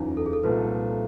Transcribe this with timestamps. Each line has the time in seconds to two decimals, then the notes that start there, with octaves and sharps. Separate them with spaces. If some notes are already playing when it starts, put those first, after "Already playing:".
Already playing: F#1 E2 C#3 D#4 F4
0.17 A4
0.26 G#4
0.33 A4
0.43 C2 A#2 F3 A3 B4